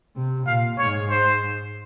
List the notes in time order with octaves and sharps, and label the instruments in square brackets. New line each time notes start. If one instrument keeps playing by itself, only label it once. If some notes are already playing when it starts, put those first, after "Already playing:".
[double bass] C3
[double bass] A#2 [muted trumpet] F5
[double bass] G#2 [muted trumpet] C#5
[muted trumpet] C5